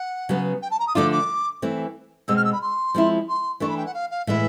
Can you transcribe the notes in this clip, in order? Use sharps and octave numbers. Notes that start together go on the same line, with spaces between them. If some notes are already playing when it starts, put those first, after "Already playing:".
Already playing: F#5
C#3 F#3 B3
G5
A5
A#5
D#6
D3 F3 A3 D4 F4 D6
D6
E3 A3 C4
B2 G#3 C4 E6
F6
E6
B5
C6
F3 G#3 C4 E4
C6
E3 A3 D4 C#6
B5
G5
F#5
F5
F5
A2 E3 G#3 B3 E4 E5